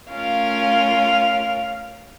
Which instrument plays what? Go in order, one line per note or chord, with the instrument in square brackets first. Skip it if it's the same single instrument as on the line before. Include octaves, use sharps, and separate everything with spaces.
[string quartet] A3 C#4 F4 A#4 [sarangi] F5